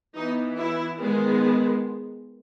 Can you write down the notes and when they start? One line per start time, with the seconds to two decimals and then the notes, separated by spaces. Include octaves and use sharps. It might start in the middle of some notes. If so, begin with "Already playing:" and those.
0.15 E3 B3 D#4
0.59 E4
1.01 D#3 G#3 B3